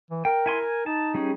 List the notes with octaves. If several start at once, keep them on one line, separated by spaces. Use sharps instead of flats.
E3
A#4 G5
E4 G#5 C6
G#5
D#4 A5
G3 C#4 G#4